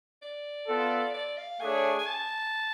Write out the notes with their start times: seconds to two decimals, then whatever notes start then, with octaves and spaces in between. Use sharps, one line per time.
0.22 D5
0.68 B3 F4 A4
1.14 D5
1.37 F5
1.60 A3 D4 G#4 C#5 G#5
1.99 G#5
2.06 A5